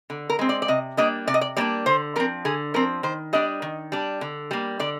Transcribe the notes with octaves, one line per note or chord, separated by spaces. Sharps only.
D3
A#4
G#3 C4
D5
D5
C3 D#5
G3 A#3 D4 D#5
C3 D5
D#5
D5
G3 A#3 D4 D5
D3 C5
F3 C4 A#4
D3 G#4
F3 C4 A#4
D#3 C5
G3 D4 D#5
D#3
G3 D4
D3
G3 A#3
D3 D5